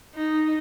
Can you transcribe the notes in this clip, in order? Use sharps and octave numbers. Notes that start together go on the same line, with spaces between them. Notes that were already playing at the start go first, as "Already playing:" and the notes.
D#4